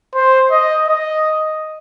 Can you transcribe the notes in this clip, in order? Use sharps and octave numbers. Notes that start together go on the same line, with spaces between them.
C5
D#5
D#5